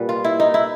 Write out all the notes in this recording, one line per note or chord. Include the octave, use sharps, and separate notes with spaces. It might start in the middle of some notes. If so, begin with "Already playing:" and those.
Already playing: A#2 G3 B4
F4
E4
D#4
E4